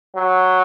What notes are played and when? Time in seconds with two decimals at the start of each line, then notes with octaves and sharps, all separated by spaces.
0.16 F#3